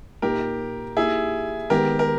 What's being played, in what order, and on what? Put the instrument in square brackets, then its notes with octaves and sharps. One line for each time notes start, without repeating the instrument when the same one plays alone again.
[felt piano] A#2 A#3 D#4 [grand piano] G4 A#4
[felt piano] A#3 D#4 G4 [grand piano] E4 G#4
[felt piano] D#3 G#3 B3 [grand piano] G4 A#4
[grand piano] A#4